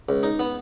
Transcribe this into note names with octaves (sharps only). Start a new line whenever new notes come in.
C#2
D#4
B3